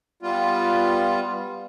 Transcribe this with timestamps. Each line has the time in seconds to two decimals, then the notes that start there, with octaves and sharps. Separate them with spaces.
0.23 G3 B3 F4